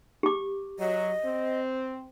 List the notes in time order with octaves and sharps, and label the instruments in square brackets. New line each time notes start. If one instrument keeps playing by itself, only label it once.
[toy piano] G4 D6
[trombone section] F#3 [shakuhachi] D#5
[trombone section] C4